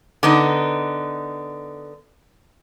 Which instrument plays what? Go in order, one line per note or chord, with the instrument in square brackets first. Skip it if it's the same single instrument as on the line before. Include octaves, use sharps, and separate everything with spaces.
[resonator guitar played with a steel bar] D3 B3 D#4